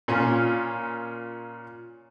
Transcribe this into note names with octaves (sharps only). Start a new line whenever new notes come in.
A#2 C#4 F4